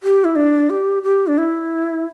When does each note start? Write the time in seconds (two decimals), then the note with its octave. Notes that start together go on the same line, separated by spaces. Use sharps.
0.03 G4
0.25 E4
0.36 D4
0.70 G4
1.03 G4
1.27 D4
1.38 E4